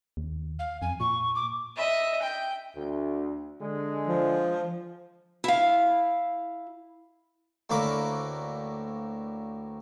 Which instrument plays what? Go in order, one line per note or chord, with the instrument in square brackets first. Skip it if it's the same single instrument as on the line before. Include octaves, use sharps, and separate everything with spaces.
[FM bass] D#2
[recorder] F5
[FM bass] F2 [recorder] G#5
[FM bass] A#2 [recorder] C#6
[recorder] D6
[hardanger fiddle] D#5 E5
G5
[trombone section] D2
D3 G#3
[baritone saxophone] F3
[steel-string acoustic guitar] E4 F5
[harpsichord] D2 A2 A#3 B4 D6